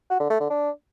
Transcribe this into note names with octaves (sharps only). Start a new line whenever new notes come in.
F#4
D3
A3
D3
D4